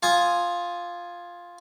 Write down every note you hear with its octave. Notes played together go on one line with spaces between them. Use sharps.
F4 G#5 D#6